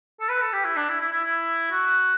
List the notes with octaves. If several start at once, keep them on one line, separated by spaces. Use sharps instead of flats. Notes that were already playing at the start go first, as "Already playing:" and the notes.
A4
B4
A4
G4
E4
D4
E4
E4
E4
E4
F#4